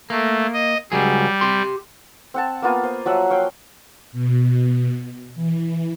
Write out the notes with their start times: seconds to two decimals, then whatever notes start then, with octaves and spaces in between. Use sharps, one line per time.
0.10 A3 A#3
0.53 D#5
0.92 C#2 F#3 G3 G#4
1.41 G4 C6
2.34 C4 F#5 A5
2.62 A#3 B3 F4 G#5
2.83 C5
3.06 F3 F#3 E5 F#5
3.30 C#5 F5 G5
4.12 B2
5.35 E3